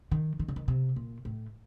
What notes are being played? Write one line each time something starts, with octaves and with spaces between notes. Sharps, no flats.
D#3
D#3
D3
D#3
C3
A#2
A2